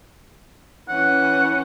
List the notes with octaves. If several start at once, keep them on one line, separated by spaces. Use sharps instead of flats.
E3 C#4 F#5